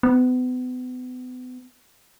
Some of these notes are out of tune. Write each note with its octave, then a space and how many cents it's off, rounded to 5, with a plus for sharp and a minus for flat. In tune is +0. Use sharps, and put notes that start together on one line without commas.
B3 +35